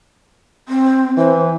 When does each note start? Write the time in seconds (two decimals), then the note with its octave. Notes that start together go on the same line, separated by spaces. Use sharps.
0.68 C4
1.17 E3 C5